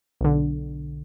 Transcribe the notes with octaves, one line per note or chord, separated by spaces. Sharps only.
B1 D3